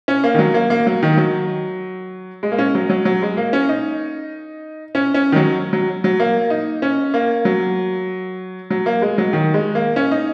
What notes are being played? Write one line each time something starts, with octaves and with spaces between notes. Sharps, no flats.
C#4
A#3
D#3
F#3
A#3
A#3
F#3
D#3
F#3
G#3
A#3
C#4
F#3
F#3
F#3
G#3
A#3
C#4
D#4
C#4
C#4
D#3
F#3
F#3
F#3
A#3
D#4
C#4
A#3
F#3
F#3
A#3
G#3
F#3
D#3
G#3
A#3
C#4
D#4